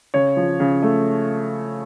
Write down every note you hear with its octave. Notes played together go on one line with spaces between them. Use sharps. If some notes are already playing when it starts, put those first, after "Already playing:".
C#3 C#5
F3
C#3
A3